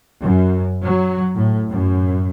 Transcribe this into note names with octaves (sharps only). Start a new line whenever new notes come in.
F#2
F#3
A2
F#2